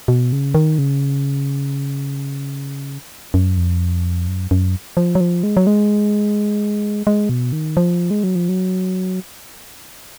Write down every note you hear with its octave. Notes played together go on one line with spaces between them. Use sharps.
B2
C#3
D#3
C#3
F#2
F2
F#2
F#2
F3
F#3
F3
G#3
F#3
G#3
G#3
B2
D#3
F3
G#3
F#3
F3
F#3